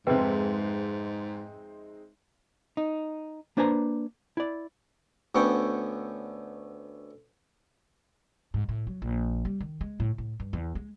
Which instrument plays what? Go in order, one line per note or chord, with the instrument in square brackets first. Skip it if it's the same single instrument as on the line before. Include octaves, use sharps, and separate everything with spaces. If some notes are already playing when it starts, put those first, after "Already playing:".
[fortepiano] F2 C3 [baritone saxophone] G#2 [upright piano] G#3 C4 D#4 [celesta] B4 G5
[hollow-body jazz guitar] D#4
A#3 D4 B4 C5 G#5 A#5
E4 D5
[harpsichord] D2 D3 B3 C#4 C#5 G5
[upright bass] G#2
A2
F#3
A#1
G3
D#3
G#3
A2
A2
G2
E2
G#3